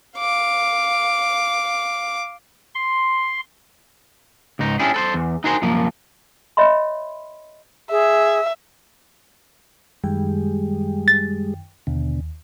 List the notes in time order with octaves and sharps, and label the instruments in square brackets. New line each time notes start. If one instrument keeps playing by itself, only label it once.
[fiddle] F5 D6
[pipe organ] C6
[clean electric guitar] C#2 G#2 D#4
C#4 D4 E4 G4 G#4
A4 B4 C5
E2
D#4 F#4 G#4 A#4 C5
C2 F#2 F3 A#3
[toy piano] C#5 D#5 E5 B5 C6
[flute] G#4 [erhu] E5
[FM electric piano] F#2 D#3 G5 [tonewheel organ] G3 G#3
[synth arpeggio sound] A6
[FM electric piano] D#2 [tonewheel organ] B2 D3